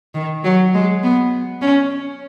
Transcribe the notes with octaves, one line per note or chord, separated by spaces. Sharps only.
D#3
F#3
G#3
B3
C#4